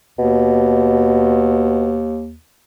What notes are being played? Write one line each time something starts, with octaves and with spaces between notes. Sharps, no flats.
D#2 B2